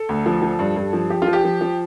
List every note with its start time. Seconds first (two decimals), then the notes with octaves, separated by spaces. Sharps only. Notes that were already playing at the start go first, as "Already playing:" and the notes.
Already playing: A4
0.09 D2
0.26 F3
0.42 F3
0.59 G2
0.76 G2
0.93 F3
1.10 F3 G4
1.22 F4
1.27 F3
1.33 G4
1.44 F3
1.61 F3